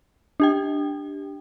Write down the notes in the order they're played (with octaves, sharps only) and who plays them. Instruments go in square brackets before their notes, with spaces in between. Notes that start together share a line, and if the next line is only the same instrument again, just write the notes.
[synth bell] D4 G4 G5